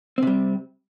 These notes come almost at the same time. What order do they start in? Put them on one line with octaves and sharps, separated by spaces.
C4 C3 G3